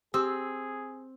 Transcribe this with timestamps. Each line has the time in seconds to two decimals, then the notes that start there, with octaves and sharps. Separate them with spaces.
0.14 C4 G4 G#4 E6